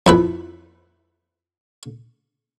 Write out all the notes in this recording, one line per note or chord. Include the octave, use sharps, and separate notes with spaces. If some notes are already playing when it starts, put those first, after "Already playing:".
F2 E4 B4